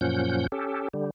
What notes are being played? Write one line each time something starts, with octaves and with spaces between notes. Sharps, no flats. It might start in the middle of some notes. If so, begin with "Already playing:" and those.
F#2 A#2 F3 C#4 F#5 G6
C#4 G4 A4
D3 G3